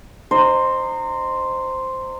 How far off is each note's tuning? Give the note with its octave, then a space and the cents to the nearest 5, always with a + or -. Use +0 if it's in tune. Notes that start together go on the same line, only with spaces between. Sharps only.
D#4 -25 C5 +0